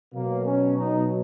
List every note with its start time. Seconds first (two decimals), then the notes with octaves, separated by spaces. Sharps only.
0.14 B2 F#3 A#3
0.45 C#4
0.76 D#4